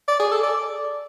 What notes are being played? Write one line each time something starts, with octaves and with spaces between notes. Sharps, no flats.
D5
G#4
A4
D5